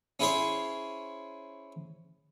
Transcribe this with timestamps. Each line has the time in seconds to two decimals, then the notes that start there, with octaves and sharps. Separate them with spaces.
0.20 C#4 E4 G#4 C5 C#5